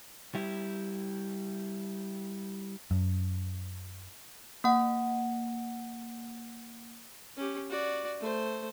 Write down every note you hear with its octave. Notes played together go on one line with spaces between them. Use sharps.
G3 E4
F#2
A#3 F#5
C#4 G4
F#4 D5
A3 C5